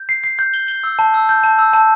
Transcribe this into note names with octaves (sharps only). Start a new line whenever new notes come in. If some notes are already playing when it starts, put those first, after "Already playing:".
Already playing: G6
C7
C7
G6
G7
G7
E6
A5
E6
G6
A5
E6
A5